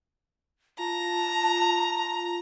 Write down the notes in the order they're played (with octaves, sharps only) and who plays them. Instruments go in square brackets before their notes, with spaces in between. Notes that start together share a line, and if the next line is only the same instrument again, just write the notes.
[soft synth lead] F4 [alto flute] A5 [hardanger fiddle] A#5